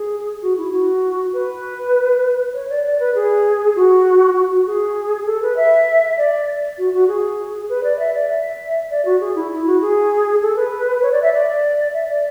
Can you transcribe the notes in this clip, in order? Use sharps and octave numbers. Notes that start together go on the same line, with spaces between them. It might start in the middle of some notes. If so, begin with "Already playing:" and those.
Already playing: G#4
F#4
E4
F#4
B4
C#5
D5
D5
B4
G#4
F#4
F#4
F#4
G#4
A4
B4
E5
D5
F#4
F#4
G#4
B4
D5
E5
D5
E5
D5
F#4
G#4
E4
E4
F#4
G#4
A4
B4
B4
C#5
D5
E5
D5
E5
D5